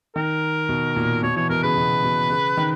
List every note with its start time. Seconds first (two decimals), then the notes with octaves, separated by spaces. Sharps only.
0.16 D#3 A#4
0.69 B2
0.96 A#2
1.22 B2 C#5
1.36 E3 C#5
1.50 B2 A#4
1.63 C#3 B4
1.77 B2
2.04 B2
2.30 C#3
2.57 D#3